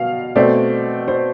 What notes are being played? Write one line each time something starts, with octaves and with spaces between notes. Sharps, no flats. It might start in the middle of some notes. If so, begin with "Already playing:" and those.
Already playing: B2 F5
B2 A3 C4 D5
C5